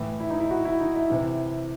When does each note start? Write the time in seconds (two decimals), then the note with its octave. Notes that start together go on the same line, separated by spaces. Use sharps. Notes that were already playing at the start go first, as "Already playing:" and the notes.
Already playing: A2 E3
0.20 E4
0.30 D#4
0.40 E4
0.51 F#4
0.65 E4
0.80 D#4
0.95 E4
1.10 C3 E3